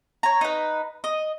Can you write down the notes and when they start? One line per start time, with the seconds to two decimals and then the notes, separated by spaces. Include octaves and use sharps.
0.23 C#5 A#5
0.41 D#4 B4
1.04 D#5